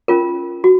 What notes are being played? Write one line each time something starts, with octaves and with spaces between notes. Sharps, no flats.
C#4 F4 A#4
F#4